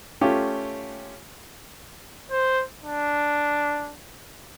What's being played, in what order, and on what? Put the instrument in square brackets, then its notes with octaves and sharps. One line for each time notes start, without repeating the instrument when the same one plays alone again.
[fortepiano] A3 C#4 F4 G4
[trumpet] C5
D4